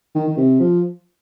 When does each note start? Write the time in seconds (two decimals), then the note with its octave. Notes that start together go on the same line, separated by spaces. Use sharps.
0.15 D#3
0.28 D#3
0.37 C3
0.60 F3